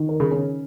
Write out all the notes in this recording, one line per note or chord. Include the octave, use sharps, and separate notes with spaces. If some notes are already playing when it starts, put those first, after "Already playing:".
Already playing: D#3
A#4
C#3
C#4